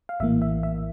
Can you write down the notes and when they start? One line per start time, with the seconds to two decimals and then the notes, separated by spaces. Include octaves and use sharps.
0.09 F5
0.20 A#1 A2 E3 A#3 E5
0.42 E5
0.63 E5